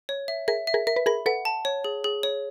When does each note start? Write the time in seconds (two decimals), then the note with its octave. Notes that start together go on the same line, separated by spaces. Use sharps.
0.09 C#5
0.28 E5
0.48 G#4 A#4 E5
0.67 E5
0.74 G#4 A#4
0.87 A#4 E5
0.96 B4
1.06 G#4 A#4 B5
1.26 A4 B4 F#5
1.45 A5
1.65 C#5
1.84 G#4
2.04 G#4
2.23 C#5